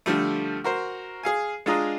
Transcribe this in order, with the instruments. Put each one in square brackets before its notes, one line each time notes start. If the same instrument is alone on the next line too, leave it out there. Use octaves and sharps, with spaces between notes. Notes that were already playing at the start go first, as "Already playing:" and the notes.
[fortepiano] D3 F3 G3 A3
F#4 A#4 C5
G#4 F5 G#5
G#3 D4 F4 G#4 D#5 A#5